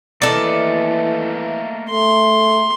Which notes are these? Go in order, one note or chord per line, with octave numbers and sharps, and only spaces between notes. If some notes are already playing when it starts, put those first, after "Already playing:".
E3 A3 A#3 A4 D5 D#5
A3 C6